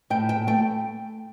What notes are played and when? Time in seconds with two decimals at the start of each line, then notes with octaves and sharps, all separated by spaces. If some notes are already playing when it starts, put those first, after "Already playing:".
0.10 A2 G5
0.29 G5
0.47 A3 G5